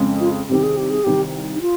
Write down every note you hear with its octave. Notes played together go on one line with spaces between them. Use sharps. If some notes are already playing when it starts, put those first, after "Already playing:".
Already playing: F2 C#3 G#3
F4
C2 C3 D#3 G4
G#4
G4
G#4
C2 C3 D#3 G4
D#4
F4